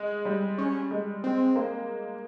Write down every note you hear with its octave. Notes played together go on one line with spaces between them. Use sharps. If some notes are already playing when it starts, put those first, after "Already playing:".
Already playing: G#3
G3
C#4
G#3
C4
A#3